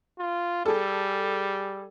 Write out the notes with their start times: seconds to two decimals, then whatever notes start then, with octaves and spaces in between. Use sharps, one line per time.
0.19 F4
0.66 G3 G#4 A4